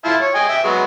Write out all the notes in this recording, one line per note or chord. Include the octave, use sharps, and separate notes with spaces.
E4 F4 A5
C#5
D#5 G5 G#5
E5 G5
F#3 G#3 B3